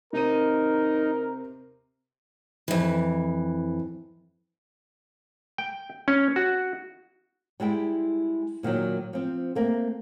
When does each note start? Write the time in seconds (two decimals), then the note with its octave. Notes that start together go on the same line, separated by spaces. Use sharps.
0.13 C3 C4 D#4 A#4 D#7
2.68 F2 E3
5.58 G5
6.08 C#4
6.36 F#4
7.60 G3 G#3 E4 G5
8.63 A#2 D#3 F3 F#3
9.13 F3 C4
9.55 A3 A#3 C4